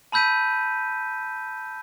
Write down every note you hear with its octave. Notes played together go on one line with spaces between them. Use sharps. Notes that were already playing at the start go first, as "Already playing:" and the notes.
A5 B5 E6 G6 B6 D#7